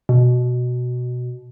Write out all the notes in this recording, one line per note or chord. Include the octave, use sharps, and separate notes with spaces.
B2